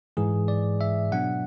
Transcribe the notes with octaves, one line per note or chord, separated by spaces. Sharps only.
G#2 E3 G#3 G#4
D5
E5
B2 F#3 B3 D4 F#5